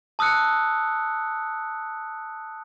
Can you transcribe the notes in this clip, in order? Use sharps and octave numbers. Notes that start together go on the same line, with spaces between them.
A5 D#6 E6 F#6 C#7